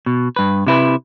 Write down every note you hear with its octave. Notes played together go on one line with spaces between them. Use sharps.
B2
G2 B4
C3 E4 B4